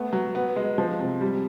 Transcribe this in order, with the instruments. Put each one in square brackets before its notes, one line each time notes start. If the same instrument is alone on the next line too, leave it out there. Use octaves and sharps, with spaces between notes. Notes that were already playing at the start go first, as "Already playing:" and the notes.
Already playing: [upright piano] A3 B3
F#3
B3
G#3
F3
C3
G3